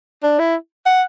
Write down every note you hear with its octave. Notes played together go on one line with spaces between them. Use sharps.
D4
E4
F#5